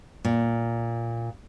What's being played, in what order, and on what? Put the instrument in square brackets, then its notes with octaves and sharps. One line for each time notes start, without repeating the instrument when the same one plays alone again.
[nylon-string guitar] A#2